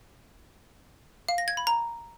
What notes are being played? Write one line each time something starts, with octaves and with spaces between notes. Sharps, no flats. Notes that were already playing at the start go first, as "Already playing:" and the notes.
F5
A#6
G#6
B5
A#5